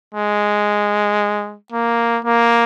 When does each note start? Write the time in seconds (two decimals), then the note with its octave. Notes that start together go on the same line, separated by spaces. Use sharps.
0.15 G#3
1.72 A#3
2.25 A#3